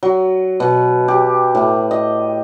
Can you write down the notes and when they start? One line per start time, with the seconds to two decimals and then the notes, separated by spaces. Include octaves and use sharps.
0.03 F#3
0.60 B2
1.08 G4
1.55 A2
1.91 D#5